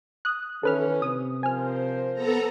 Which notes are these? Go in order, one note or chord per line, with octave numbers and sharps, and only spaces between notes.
D#6 F#6
D#3 E3 C#4 A4 B4 F6
C3 D#6
F3 A#4 C5 G#5 F6
B3 A4 A#5